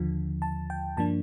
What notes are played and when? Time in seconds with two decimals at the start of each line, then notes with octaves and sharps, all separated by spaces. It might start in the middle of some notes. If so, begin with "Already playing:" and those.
Already playing: D#2 D3 F3
0.42 A5
0.70 G5
0.97 G2 F3 A#3 D4 A5